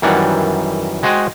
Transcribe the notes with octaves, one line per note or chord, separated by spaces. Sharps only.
F#2 D#3 E3 G3 F#5
G#3 F#4 C5 D#5 G5 G#5